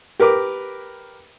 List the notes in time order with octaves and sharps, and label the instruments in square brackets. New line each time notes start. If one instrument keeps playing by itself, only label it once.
[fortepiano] G4 A#4 B4 D6